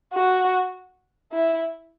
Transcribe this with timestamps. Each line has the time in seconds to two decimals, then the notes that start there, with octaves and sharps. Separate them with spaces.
0.14 F#4
1.33 E4